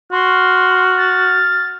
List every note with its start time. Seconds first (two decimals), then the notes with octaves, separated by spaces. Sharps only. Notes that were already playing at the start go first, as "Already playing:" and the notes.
0.12 F#4 C6 F6
0.98 A6